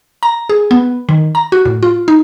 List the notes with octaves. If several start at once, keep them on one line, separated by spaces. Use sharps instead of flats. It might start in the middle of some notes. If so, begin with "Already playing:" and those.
A#5
G#4
B3
D#3
A#5
F#4
A2
F4
D#4